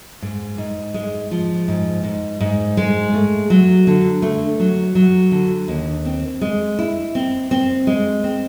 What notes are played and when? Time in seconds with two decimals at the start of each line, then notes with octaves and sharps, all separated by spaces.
0.22 G#2
0.58 G#2
0.94 G#3
1.31 F3
1.68 G#2
2.04 G#2
2.40 G#2
2.77 G#3
3.14 A3
3.50 F#3
3.87 D3
4.22 A3
4.59 F#3
4.95 F#3
5.32 D3
5.68 D#2
6.05 C4
6.41 G#3
6.79 E4
7.15 C4
7.51 C4
7.87 G#3
8.24 C4